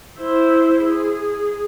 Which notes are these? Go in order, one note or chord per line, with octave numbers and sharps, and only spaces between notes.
E4 C5
G#4